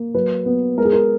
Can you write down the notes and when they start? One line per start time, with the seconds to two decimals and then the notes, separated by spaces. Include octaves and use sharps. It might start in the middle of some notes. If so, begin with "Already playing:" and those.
Already playing: A#3
0.14 F#3 B4
0.46 B3
0.77 G#3 A#4
0.85 G#4
0.93 A#4